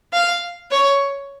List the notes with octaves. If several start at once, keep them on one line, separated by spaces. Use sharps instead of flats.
F5
C#5